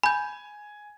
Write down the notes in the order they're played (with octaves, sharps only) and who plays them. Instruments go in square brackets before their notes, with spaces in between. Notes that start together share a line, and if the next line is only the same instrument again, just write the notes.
[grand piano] G#5 [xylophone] B5 G6